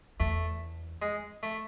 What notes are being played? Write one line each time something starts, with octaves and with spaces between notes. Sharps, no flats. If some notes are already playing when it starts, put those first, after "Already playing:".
E2 A3
G#3
A3